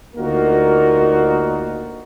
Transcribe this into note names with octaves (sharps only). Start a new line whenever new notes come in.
D2 A#3 D#4 F4 F#4 A#4